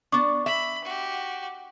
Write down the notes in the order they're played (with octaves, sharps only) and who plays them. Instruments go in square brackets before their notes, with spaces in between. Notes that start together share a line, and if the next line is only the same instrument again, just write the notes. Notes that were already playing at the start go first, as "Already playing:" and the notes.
[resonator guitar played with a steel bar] B3 D4 [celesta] C#6 D6
[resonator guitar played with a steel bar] E5 [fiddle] B5
[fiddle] F#4 G4